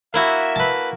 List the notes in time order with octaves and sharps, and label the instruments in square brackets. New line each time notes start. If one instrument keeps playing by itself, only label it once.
[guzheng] A#3 E4 F#4 [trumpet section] E5
[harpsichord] B4 A5